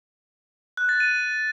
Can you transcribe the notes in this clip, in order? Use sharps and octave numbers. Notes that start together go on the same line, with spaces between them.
F#6
A6
D#7